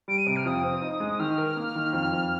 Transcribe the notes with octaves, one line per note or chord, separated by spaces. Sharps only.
G3 D7
D#7
C3 D7
F6
F2 D#6
C4
D#4
G#3
D#3 F6
A#4
A#3
D#3
F2
F2